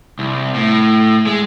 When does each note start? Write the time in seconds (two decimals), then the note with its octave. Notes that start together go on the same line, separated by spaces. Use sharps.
0.19 C2
0.54 A2
1.27 G#3